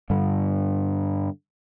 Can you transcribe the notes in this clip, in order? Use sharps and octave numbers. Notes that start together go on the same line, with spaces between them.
G2 D3